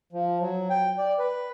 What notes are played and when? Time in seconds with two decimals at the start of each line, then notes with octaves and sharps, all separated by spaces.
0.13 F3
0.40 F#3
0.70 G5
0.98 D5
1.19 B4